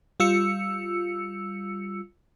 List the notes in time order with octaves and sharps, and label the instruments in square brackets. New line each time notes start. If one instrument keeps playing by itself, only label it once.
[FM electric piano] G3 F4 E6 C#7